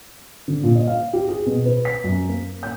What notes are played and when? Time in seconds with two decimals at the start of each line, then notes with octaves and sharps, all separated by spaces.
0.48 D3
0.63 A#2
0.75 D#5
0.87 F5
1.13 G4
1.28 G#4
1.46 B2
1.65 B4
1.85 B6
2.04 F#2
2.29 A#3
2.63 G6